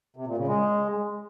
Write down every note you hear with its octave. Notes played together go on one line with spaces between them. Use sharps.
C3
A#2
C#3
G#3